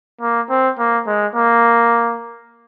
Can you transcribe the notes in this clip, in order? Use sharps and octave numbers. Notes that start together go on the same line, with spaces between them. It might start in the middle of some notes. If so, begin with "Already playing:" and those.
A#3
C4
A#3
G#3
A#3